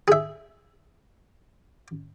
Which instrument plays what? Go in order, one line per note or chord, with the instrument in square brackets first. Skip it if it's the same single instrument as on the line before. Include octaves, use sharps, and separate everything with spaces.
[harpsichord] G#4 E5